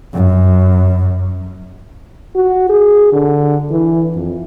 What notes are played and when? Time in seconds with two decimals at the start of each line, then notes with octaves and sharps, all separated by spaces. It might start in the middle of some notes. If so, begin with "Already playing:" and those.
0.14 F#2
2.36 F#4
2.69 G#4
3.13 D3
3.71 E3
4.15 F2